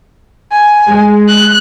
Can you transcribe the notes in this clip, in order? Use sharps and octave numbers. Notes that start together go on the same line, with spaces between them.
G#5
G#3
F#6